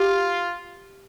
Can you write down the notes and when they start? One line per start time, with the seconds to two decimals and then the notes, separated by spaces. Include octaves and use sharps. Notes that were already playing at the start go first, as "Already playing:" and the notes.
Already playing: F4 G4